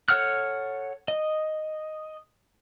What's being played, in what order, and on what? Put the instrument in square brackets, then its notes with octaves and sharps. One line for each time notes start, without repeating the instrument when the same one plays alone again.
[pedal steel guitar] A4 C#5 F#5 F6 F#6
D#5